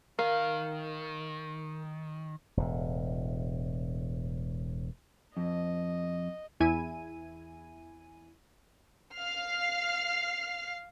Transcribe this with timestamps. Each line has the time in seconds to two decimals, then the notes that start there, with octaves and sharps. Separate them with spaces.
0.19 D#3 A#4 F5
2.57 E1 A2
5.37 F2 D#5
6.60 E2 E4 G#5 D#7
9.16 F5 F6 C7